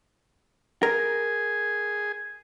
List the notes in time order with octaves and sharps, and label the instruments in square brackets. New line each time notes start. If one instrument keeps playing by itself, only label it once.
[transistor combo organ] G#4 [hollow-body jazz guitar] A#4